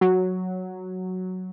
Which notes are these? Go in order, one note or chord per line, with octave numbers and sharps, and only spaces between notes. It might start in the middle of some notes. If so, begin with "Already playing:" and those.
F#3